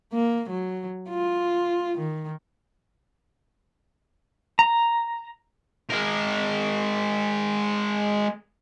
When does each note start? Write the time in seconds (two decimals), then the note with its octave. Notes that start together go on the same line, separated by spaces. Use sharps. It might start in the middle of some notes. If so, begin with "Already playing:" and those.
0.13 A#3
0.49 F#3
1.09 F4
1.97 D#3
4.59 A#5
5.90 G#3 A#4